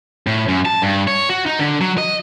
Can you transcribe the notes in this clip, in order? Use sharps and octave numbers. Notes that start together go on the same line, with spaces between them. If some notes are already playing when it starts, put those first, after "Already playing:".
A2
F#2
A5
G2
C#5
F#4
D#4
D3
F#3
D#5